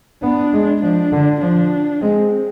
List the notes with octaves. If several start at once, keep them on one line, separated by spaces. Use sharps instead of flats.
B3 D4
G#3
F3 D4
D3
F3 D4
G#3 C4